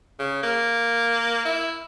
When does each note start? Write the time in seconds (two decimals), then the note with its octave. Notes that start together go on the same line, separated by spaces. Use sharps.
0.20 C#3
0.43 A#3
1.46 E4